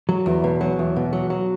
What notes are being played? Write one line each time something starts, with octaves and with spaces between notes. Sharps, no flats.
F#3
E2
B2
F#3
E2
B2
F#3
F#3